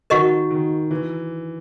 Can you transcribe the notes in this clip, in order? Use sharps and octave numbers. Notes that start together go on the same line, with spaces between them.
D#3 F#4 A#4 D#5 F#5 C#6
D#3
E3